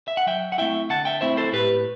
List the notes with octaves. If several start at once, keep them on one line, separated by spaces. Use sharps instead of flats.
E5
F#5
F#3 E5 G5
F#5
A3 C4 E4 E5 G5
D3 F#5 A5
E5 G5
A3 C4 E4 C5 E5
A4 C5
A2 G4 B4